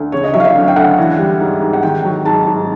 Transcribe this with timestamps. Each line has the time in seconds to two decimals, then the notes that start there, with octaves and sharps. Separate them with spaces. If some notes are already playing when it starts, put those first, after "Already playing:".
Already playing: D2
0.12 C#3 C#5
0.24 D#5
0.33 F#3 E5
0.40 F5
0.45 E5
0.55 D2
0.68 G5
0.76 D2 F#5
0.98 E3
1.19 G3
1.40 G#2
1.62 G#2
1.73 F#5
1.83 D#3 G5
2.05 F#3
2.25 G#2 A5
2.47 G#2